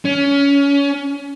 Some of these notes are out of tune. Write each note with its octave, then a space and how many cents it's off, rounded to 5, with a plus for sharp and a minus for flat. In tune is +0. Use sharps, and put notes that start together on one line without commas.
C#4 +25